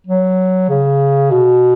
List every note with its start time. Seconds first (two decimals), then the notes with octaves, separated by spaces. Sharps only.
0.07 F#3
0.69 C#3
1.31 B2